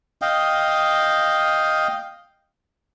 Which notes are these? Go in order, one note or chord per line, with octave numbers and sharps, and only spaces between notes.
D#5 F5 G5